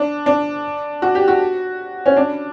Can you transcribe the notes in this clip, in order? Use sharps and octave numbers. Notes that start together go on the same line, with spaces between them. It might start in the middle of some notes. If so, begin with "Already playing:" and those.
Already playing: D4
D4
F#4
G4
F#4
C#4
D4